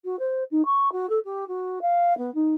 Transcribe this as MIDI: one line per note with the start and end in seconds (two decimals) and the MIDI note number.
0.05 0.16 66
0.19 0.44 72
0.51 0.65 63
0.65 0.92 85
0.92 1.09 66
1.09 1.19 69
1.25 1.45 67
1.48 1.79 66
1.82 2.16 77
2.18 2.33 59
2.35 2.55 63